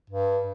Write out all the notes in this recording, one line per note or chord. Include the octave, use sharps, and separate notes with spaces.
G2